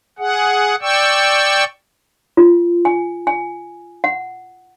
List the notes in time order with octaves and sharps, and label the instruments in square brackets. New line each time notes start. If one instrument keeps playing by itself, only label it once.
[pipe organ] G#4 F#5
D5 G5 C#6 E6
[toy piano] F4
G#5
G#5
F#5